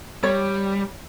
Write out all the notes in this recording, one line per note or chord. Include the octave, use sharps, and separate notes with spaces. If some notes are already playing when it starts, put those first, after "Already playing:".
G3 C#5